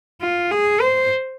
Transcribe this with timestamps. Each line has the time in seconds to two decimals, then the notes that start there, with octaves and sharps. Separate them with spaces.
0.21 F4
0.51 G#4
0.81 C5